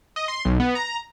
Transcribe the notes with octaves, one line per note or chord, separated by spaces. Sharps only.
D#5
C6
B1
B3
A#5